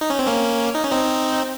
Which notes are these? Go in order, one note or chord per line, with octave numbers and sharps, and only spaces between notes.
D#4
C#4
C4
A#3 C#4
D#4
C#4
C4 D#4